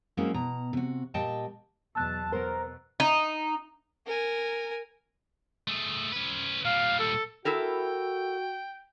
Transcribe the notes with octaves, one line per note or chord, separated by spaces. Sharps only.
F#3 G#3 A#3 C4 C#4 E4
B2 A#5
C3 F#4
A#2 G3 D#5 G5 A5
E2 B2 F#3 A5 E6 F#6 A6
B2 B3 A#4 C5
D#4
A#4 G#5
A3 G#4
C#4 B4
A#2 G3 F5
A4
E4 F#4 A4 A#4 G5